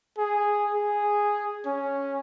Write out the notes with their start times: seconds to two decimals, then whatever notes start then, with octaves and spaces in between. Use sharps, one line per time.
0.18 G#4
0.74 G#4
1.66 C#4